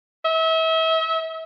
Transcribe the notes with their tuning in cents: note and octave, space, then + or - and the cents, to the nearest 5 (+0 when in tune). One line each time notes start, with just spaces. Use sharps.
E5 -35